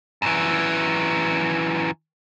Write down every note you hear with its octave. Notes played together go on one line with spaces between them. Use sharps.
F#2 E3